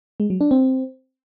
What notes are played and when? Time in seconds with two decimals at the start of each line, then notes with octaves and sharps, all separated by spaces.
0.20 G#3
0.30 F#3
0.41 D4
0.51 C4